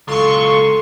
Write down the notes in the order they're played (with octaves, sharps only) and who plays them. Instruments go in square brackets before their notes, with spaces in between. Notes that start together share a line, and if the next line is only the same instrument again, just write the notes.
[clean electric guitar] C#2 [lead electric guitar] F#3 F4 [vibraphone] A4 [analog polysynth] C6 C#6